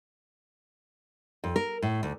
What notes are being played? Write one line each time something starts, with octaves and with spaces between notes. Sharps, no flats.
F2
A#4
A2
D2